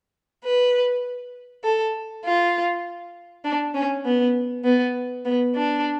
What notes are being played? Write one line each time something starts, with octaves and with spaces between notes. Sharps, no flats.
B4
A4
F4
D4
C#4
B3
B3
B3
D4